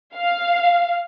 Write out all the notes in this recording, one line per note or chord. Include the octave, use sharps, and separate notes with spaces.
F5